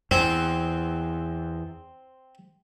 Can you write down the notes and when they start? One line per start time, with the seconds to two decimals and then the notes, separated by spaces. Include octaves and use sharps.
0.11 E2 C4